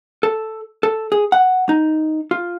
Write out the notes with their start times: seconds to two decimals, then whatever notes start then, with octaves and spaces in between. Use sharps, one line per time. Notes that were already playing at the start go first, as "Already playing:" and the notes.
0.23 A4
0.83 A4
1.12 G#4
1.32 F#5
1.69 D#4
2.31 F4